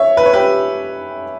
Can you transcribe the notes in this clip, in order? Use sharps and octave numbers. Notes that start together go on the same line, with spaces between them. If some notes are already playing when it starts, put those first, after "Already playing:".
Already playing: C#5 E5
B4
C#5
G4 B4